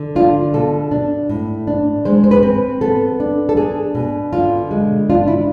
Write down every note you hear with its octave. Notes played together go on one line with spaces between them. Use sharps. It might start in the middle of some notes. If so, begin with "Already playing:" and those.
Already playing: D3
D4 F4
B2 A4
D4
A2
D4
G#3 C5
C5
B4
C4
B3 A4
D4
A4
D4 G#4
B2
D3 F4
G#3
D4 F4
E4